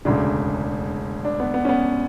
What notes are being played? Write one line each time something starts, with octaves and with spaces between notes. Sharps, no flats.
E1 D2 C#3 D4
D4
B3
B3
C#4
B3